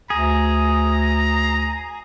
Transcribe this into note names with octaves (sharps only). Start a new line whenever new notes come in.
D2 G#4 A#5